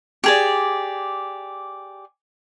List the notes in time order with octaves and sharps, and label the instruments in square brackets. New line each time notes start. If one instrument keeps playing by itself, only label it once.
[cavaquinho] G4 G#4 D5